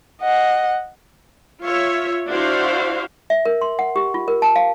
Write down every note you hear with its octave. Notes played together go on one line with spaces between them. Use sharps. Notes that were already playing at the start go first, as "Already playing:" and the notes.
D#5 F#5
F4 C#5 E5
D4 E4 F#4 C5 F5
E5
A#4
C6
F#5
G4
F4
A#4
A5
F5